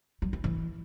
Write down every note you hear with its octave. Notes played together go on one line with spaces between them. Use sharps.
F#3
E3
E3